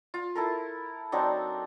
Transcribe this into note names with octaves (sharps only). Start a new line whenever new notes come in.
F4
E4 A4 A#4
F#3 C4 D4 D#4